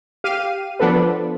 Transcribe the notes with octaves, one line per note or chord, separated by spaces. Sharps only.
G4 F5 D#7
F3 B3 D4 A4 B4